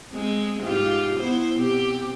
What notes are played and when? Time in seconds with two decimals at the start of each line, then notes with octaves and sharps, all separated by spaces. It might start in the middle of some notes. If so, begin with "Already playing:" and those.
0.13 G#3 C4
0.63 G#2 F4 G4
1.19 B3 E4 C5
1.58 B2 C4 G4